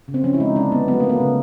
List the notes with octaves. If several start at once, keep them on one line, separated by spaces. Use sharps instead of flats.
C#3
C4
F3 C#4
E4
G#3 D#4
D3 D4
D3 B3
F#3 B3
A3 A#3
B3
C#3